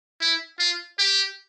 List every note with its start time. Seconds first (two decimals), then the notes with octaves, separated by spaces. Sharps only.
0.21 E4
0.59 F4
0.98 G4